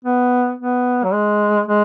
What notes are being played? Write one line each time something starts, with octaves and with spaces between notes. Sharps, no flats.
B3
B3
F#3
G#3
G#3